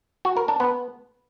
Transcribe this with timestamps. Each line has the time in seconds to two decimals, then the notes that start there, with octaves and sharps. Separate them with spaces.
0.25 F#4
0.37 A#4
0.48 D4
0.60 B3